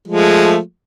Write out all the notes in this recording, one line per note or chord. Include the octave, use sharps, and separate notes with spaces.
F3 G#3 A3